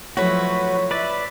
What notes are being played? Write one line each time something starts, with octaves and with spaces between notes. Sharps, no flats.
F3 F#3 A3 E4 F#4 B4 C#5
B4 D5 E5